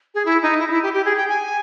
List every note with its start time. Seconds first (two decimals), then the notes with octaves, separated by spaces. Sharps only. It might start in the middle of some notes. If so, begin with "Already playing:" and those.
0.15 G#4
0.26 E4
0.43 D#4
0.60 E4
0.67 D#4
0.71 E4
0.83 G4
0.94 G4
1.05 G#4
1.17 G5
1.29 G#5